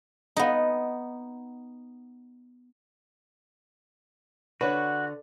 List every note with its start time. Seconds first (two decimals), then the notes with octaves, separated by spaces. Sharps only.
0.37 B3 D#4
4.61 D3 F#4 B4 C#5